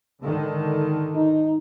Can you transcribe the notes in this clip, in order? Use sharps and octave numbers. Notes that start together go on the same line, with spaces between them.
G#2 D3 D#3
D#4